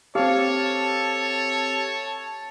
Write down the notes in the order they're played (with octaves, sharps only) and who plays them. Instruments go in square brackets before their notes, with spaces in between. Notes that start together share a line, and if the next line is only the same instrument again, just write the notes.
[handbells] C4 G4 [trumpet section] A4 C#5 [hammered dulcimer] F5 [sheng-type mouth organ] A5